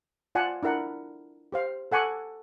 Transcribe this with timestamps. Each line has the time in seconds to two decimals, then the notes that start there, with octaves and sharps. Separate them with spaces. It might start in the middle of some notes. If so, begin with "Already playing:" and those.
0.35 F4 D5 F#5 G#5 A5
0.63 D4 E4 A#4 F#5
1.52 G4 C5 F5
1.92 A4 F#5 G#5 C#6 D6